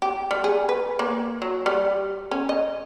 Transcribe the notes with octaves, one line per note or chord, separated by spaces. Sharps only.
G4
G3
G#4
B4
A#3
F#3
G3
C#4
D#5